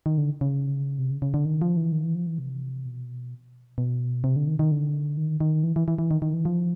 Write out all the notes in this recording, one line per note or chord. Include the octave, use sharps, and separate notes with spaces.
D#3
D3
C#3
C3
C#3
C#3
D3
D#3
F3
E3
D#3
E3
F3
E3
C3
B2
B2
C3
D3
D#3
D#3
D3
D#3
D#3
E3
E3
E3
E3
D#3
D#3
E3
F3